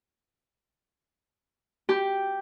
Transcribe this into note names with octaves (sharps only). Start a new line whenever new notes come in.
G4